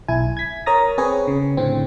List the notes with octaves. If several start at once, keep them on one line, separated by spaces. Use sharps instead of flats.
B1 E4 G#5
G#6 B6
A#4 C#5 A#5 D#6 A6 A#6
C4 G#4 B4 C#5
C#3
A2 D3 C4